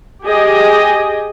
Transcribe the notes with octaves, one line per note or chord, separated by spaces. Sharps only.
G4 G#4 D#5 G#5